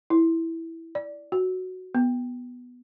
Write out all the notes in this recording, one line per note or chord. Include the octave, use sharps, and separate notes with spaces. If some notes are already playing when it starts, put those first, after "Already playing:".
E4
D5
F#4
B3